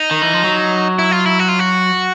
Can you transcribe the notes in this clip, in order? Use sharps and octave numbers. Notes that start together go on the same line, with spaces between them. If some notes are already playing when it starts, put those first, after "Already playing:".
Already playing: D#4
D#3
E3
F3
F#3
E4
F4
E4
F#4
F4
F#4